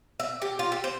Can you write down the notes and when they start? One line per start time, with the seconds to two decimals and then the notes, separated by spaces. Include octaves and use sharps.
0.20 E5
0.42 G4
0.59 F4
0.72 G4
0.84 C5